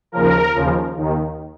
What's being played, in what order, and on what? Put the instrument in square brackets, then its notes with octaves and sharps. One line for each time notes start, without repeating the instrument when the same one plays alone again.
[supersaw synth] D#2 C#3 F3 A#4
D#2 C#3 F3
D#2 D#3